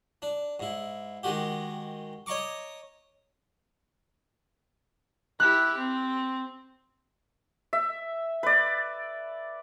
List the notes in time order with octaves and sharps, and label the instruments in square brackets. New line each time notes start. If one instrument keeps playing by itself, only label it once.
[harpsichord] D4
G#2 E4
D#3 G#3 F#4 G4
C#5 D#5 A#5 C#6 D6
[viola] E4 G4 [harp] F#6
[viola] C4
[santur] E5
B4 D5